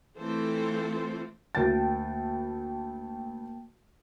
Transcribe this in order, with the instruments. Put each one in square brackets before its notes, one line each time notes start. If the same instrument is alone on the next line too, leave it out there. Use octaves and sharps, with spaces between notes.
[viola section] E3 A3 C4 F4 A4 C5
[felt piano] D2 A6 [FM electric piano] A#3 G5 A5